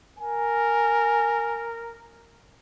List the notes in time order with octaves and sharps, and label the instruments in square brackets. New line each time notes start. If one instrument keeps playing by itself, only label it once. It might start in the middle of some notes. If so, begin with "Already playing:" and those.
[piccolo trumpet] A#4 [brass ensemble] G#5